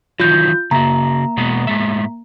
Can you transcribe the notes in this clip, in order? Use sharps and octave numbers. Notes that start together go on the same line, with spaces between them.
D#3 E3 F#3 F4 G6
C#3 A#3 F#4 A#5
B2 G#3 B3
A2 G#3 E5